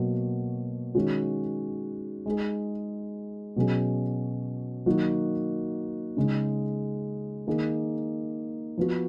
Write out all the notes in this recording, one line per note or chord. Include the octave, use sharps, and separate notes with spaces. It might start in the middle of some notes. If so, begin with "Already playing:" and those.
Already playing: B2 F#3 A#3
D#3 G#3 C#4 F#4
G#3 D#4 G#4
B2 F#3 C#4 G#4
D#3 F#3 A#3 D#4 F#4
C#3 G#3 D#4
D#3 A#3 D#4 G#4
F3 B3 F#4